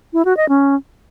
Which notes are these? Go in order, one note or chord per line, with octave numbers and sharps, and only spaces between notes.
E4
F#4
D#5
C#4